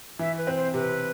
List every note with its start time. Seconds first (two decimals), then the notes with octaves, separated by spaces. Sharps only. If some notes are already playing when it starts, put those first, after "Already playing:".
0.19 E3 E5
0.38 B4
0.47 C4
0.56 C5
0.74 C3 B4